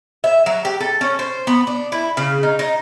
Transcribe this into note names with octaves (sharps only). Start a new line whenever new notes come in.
E5
F#3
G4
A4
C#4
C5
B3
D4
E4
C#3
D#4
D#4